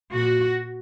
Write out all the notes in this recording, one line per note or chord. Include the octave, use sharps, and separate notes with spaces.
A#2 F#4